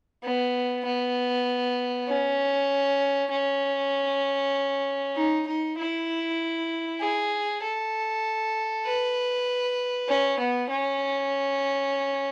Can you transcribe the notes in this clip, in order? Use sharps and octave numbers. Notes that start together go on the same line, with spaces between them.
B3
B3
C#4
C#4
D#4
D#4
E4
G#4
A4
B4
C#4
B3
C#4